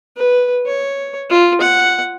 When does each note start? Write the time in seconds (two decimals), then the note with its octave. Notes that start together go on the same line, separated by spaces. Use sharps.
0.17 B4
0.66 C#5
1.30 F4
1.61 F#5